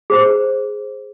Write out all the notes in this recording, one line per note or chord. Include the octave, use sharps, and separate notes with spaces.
G#4 C5 A#5